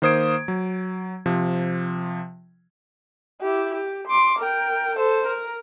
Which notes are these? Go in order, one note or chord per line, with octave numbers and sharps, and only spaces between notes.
D#3 A#3 C5 D#6 G#6 D7
F#3
C3 F3
E4 G4
G4
C6 D6
A#4 G5
A4 C5
A#4